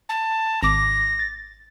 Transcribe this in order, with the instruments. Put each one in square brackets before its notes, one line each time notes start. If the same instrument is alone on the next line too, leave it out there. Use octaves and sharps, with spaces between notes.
[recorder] A5
[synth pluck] G#1 D6 [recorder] A#6
[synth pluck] A6